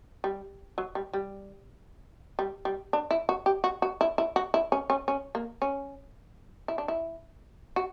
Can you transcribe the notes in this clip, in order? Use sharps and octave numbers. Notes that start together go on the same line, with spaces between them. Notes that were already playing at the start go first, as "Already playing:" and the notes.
G3
F#3
G3
G3
G3
G3
D4
E4
F#4
G4
F#4
F#4
E4
E4
F#4
E4
C#4
C#4
C#4
A#3
C#4
E4
D4
E4
F#4